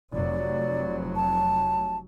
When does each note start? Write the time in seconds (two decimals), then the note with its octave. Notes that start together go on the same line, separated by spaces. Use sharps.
0.13 F1 F#3 D5
1.16 A5